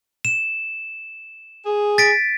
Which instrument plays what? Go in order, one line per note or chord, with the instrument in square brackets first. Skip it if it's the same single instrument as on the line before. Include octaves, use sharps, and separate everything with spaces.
[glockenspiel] E7
[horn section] G#4
[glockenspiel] A6 B6 D7